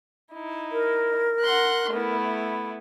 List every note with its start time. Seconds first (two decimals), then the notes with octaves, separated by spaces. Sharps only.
0.32 D#4 E4
0.72 A#4
1.42 F#5 C6 F#6
1.91 A3 B3 E4